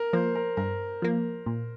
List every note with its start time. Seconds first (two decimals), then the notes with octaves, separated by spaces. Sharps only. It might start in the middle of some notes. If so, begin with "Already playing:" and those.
Already playing: A#4
0.13 F3 A#3 C5
0.35 A#4
0.57 G2 A#4
1.02 F3 A#3
1.46 A#2